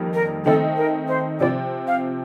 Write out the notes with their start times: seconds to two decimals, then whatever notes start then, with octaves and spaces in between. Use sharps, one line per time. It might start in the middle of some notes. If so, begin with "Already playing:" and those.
Already playing: F2 D#3 G3 A#3 D#4
0.14 A#4
0.45 D#3 A3 C4 D#4 A4
0.77 A#4
1.08 C5
1.40 C3 F3 C4 D5
1.87 F5